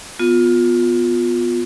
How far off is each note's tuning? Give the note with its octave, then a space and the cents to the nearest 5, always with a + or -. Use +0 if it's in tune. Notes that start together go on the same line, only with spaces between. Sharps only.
B3 +0 F4 +20